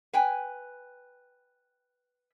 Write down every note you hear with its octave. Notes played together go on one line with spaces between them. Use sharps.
B4 G5 G#5